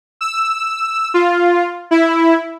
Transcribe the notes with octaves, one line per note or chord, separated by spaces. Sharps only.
E6
F4
E4